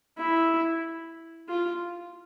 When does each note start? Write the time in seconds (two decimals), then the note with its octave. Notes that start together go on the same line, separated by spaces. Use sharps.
0.17 E4
1.48 F4